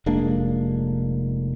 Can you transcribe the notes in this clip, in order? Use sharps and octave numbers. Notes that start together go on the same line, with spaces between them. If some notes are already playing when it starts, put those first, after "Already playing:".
F1 G#3 A#3 D4